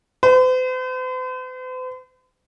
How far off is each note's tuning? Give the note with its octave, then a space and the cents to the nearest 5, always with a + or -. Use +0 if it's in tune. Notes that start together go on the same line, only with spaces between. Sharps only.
C5 -45